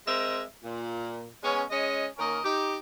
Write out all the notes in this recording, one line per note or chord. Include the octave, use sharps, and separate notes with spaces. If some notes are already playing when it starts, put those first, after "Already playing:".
G#3 C4 A#4 D#5 E5
A#2
G#3 B3 C#4
G#3 C#4 D#5
D#3 A#3 C#4 A#4 D#5
D#4 G4